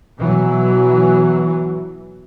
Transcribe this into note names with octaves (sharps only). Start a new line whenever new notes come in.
B2 E3 F#3